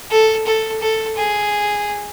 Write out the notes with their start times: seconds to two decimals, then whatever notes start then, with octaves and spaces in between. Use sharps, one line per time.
0.11 A4
0.47 A4
0.82 A4
1.17 G#4